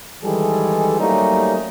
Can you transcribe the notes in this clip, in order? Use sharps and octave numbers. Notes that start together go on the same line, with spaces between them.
D#3 E3 G3 G#3 G#4 A4
F#3 G3 A3 A#3 C#4 D#4